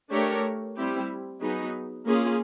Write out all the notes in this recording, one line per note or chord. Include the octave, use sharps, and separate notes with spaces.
A3 D4 G4 A#4 C#5
G3 C4 E4 G4
F#3 B3 D#4 G#4
A#3 C#4 F4 G#4